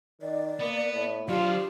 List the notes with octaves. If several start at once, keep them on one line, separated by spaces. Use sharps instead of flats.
D#3 D5
A#3 B3
A2
F#3 D4 F4 G4 C5